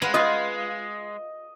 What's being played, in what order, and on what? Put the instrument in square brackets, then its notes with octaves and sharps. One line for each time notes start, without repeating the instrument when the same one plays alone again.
[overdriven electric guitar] G#3 [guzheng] B4 F5 F#5
[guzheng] F4 B4 [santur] D#5